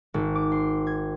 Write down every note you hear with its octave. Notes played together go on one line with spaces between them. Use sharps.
G#1
D6
C6
G#6